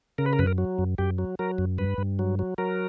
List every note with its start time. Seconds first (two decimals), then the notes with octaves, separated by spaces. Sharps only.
0.18 C#3 A#4
0.26 B4
0.33 A#4
0.39 F#2 B4
0.47 A#4
0.58 F#3
0.79 F#2
0.98 F#2 G4
1.18 F#3
1.39 F#3 A#4
1.58 F#2
1.78 G2 B4
1.98 G2
2.19 F#3
2.39 F#3
2.58 F#3 A#4